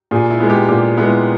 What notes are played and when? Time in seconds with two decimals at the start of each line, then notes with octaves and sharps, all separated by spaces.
0.11 A#2 G#4
0.30 E4
0.40 G#3 B3
0.50 G4
0.69 A#2 G4
0.97 G#3 B3 E4